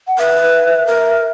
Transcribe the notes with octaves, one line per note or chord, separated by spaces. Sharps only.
F#5
B4 E5
A#4